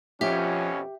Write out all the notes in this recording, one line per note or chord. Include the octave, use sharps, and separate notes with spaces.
F2 B2 F3 C#4 G4 E5